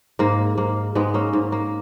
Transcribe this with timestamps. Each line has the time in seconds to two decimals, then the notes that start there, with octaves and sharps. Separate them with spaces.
0.19 G#2 A#3
0.58 G#2 A#3
0.95 G#2 G#3 B3
1.14 A#3 C#4
1.33 G#2
1.52 A#3